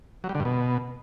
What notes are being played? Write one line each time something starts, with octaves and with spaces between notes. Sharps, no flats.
F#3
G3
D3
G2
B2